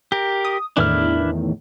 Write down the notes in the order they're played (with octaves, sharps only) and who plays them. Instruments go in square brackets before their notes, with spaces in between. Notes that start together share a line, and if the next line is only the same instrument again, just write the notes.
[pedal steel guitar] G4 A#4
[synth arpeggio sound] D#6
[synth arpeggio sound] E2 A2 D#3 [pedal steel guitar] D4 E4 F6